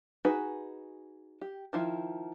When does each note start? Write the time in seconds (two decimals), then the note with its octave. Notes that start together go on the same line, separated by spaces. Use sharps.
0.25 D#4 F#4 G#4 B4
1.41 G4
1.73 D#3 F3 E4